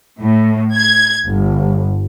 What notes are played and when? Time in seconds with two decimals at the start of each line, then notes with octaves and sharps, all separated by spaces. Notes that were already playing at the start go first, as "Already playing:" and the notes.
0.20 A2
0.75 G#6
1.29 G1